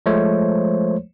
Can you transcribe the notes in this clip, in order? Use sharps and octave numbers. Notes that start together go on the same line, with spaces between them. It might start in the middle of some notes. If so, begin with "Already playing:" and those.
F3 G#3 A3 C5 C#5